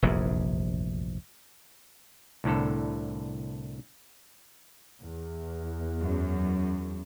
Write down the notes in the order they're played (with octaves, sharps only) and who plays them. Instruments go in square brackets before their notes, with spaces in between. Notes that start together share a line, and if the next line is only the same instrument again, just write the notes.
[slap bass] F1 A#1 E2 G2
[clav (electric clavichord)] C2 A2 D3 A4
[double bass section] E2
[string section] F#2